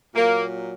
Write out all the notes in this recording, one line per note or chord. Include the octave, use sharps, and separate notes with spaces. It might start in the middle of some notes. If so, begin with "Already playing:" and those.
A#2 F#3 A#3